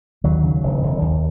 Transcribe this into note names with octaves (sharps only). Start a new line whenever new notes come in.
D#2 D#3 F#3
C#3
E1
E1
D#2